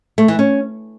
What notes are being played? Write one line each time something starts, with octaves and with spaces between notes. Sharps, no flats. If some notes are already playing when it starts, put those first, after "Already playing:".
A3
E3
C#4